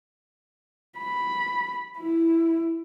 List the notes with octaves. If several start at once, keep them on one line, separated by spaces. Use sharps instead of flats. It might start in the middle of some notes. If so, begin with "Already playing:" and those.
B5
E4